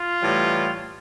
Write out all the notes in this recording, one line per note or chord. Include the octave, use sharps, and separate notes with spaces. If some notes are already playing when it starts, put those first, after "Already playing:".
Already playing: F4
A2 E3 G3